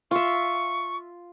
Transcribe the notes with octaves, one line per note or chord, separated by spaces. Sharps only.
F4 E5 C#6